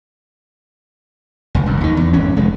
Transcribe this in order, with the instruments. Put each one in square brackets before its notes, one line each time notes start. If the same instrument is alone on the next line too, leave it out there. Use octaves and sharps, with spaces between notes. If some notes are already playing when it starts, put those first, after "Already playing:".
[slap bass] F1 D2
C2 F#2
D#2 D#3
E2
G#1 F2 C#4
F1 G#3